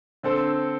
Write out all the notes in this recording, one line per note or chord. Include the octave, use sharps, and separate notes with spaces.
D3 C4 A4 C5